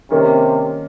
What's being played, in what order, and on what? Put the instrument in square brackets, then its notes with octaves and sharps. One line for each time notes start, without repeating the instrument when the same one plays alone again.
[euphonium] C3 [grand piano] D#3 A#3 C#4